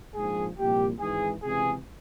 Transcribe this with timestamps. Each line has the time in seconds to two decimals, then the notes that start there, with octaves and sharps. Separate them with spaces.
0.15 A#1 G#2 F3 G#4
0.57 C2 A#2 F3 G4
1.00 G#1 G#2 E3 G#4
1.43 C#2 C3 E3 G#4